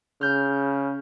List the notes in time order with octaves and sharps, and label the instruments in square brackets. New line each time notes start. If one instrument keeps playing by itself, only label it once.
[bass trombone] C#3 [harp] F6 G6